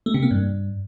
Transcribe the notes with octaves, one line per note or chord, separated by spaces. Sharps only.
A3
C3
A#3
G2